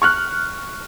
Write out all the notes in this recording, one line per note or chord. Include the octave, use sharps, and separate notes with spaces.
C#6 F6 F#6